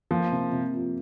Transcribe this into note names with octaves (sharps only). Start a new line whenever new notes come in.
F3 A#3
C3
C3
F3